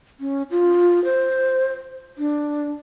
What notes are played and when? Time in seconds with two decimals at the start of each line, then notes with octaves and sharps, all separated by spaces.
0.20 C#4
0.51 F4
1.04 C5
2.18 D4